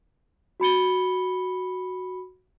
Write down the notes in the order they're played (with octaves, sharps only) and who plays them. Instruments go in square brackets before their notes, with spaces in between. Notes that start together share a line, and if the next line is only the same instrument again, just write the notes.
[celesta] F#4 B5 C#7 G7